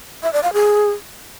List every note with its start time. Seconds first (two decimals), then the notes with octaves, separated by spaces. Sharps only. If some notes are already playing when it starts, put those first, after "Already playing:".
0.23 E5
0.33 D5
0.43 F5
0.53 G#4